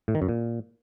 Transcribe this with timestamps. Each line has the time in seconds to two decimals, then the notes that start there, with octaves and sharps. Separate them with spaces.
0.08 A2
0.15 D#3
0.22 F#2
0.29 A#2